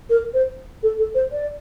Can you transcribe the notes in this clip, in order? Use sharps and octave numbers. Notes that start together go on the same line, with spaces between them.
A#4
C5
A4
A4
C5
D5